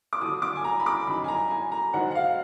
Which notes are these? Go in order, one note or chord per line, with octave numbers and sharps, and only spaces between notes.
D6
D#2 D3 F#3 D#6
D6
G#5
A#5
B5
D6
F#2 D#3 F#3 B5
G#5
A#5
G#5
A#5
G#2 D#3 F#3 F#5
F#5
F5